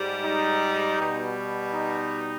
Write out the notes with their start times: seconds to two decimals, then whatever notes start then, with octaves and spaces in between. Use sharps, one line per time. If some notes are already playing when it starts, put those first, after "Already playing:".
Already playing: G#2 G3
0.23 D#4
0.99 B2 G3
1.73 D#4